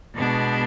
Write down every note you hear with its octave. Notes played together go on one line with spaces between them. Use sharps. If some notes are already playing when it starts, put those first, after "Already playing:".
B2 G#3 B3 D4